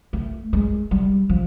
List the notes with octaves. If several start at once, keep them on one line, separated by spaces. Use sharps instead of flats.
A3
G#3
G3
F3